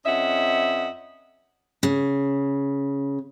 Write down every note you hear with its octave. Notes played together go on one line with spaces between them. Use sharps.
F2 C#4 D#5 E5 F#5
C#3